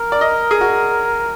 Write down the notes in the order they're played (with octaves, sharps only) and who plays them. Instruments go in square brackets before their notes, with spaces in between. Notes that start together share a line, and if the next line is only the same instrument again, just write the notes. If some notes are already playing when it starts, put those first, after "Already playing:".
Already playing: [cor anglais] A#4
[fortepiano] D5
D#5
G#4
F#4